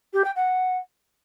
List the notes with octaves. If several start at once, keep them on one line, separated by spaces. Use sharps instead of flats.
G4
G5
F#5